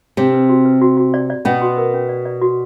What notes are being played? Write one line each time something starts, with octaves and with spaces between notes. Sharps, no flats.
C3 C4 D4
B4
F#4
B4
F#4
F#4
D5
D5
B2 B3 C#4
F#4
A#4
C#4
D5
D5
F#4